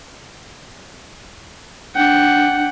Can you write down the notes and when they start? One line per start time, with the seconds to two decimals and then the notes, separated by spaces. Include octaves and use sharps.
1.96 D4 F#5 G5